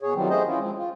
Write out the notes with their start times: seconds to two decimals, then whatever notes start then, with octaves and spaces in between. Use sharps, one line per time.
0.02 B2 G#4 C#5
0.15 D#3 E3 F#3 G3 C4
0.30 A3 B3 C#4 G#4 C5 D#5
0.47 E3 C#4 E4 F4
0.59 F3 G#3 C4
0.78 F4